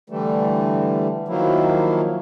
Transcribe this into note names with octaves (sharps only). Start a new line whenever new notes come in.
D3 E3 G3 A3
D#3 F3 F#3 A#3 E4